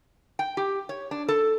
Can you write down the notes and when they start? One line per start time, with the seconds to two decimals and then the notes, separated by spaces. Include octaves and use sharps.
0.39 G5
0.57 G4
0.89 C#5
1.11 D4
1.28 A4